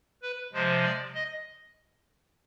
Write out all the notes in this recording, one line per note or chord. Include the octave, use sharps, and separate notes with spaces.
B4
C3 F3 G#3 C5
D5
D#5